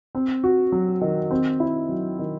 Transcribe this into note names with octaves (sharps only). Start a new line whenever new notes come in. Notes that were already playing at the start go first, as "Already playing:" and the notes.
C4
F#4
F#3
D#3
C4
E4
F#3
D#3